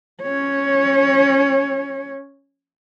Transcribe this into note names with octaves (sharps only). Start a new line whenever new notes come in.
C#4 C#5